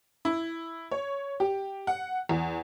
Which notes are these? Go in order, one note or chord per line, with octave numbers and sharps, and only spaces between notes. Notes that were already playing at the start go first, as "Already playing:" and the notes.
E4
C#5
G4
F#5
E2